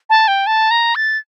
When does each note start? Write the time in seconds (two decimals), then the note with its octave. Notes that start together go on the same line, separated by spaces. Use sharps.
0.10 A5
0.28 G5
0.47 A5
0.71 A#5
0.95 A6